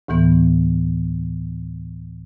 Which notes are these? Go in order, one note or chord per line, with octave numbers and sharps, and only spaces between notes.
D2 A2 E3 B3